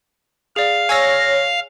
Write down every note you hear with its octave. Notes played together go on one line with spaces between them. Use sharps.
G#4 D5 F5
C#5 G#5 E6 F6 A#6